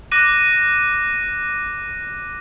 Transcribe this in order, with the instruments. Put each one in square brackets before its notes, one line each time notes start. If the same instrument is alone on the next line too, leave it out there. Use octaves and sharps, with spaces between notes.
[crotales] D6 F#6 A#6 D#7